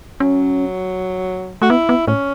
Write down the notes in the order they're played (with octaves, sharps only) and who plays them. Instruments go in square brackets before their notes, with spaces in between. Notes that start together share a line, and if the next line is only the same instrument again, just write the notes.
[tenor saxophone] F#3 [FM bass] C#4
[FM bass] A3 [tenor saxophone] F#4
[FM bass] B3 [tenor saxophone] E4
[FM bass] B3
[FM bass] A2 [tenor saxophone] C#4